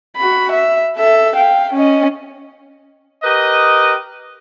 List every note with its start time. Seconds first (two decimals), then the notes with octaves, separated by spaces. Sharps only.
0.17 F#4 B5
0.52 E5
0.97 A4 E5
1.36 F5 G5
1.74 C#4 D#5
3.24 G4 A#4 B4 D#5